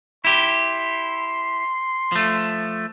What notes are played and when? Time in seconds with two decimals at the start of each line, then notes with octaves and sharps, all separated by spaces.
0.25 E4 G4 C6
2.12 F3 A3